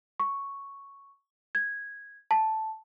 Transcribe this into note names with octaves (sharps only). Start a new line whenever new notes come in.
C#6
G#6
A5